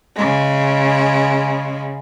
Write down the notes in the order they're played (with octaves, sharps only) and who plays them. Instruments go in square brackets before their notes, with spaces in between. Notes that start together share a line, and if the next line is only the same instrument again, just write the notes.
[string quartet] C#3 G#3